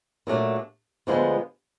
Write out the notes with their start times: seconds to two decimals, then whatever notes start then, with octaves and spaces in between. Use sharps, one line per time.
0.27 A#2 F#3 A3 D4
1.07 D2 D3 F3 G#3 B3